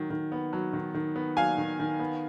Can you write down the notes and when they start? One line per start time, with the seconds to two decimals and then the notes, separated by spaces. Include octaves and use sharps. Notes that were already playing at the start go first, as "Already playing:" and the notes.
Already playing: D#3 F#3
0.10 D#3
0.32 B3
0.53 F#3
0.73 D#3
0.94 D#3
1.16 B3
1.36 F#3 F5 G#5
1.58 D#3
1.79 D#3
2.00 B3